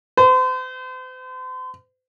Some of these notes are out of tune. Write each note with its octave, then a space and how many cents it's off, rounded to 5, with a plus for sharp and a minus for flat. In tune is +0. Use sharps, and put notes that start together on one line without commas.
C5 -40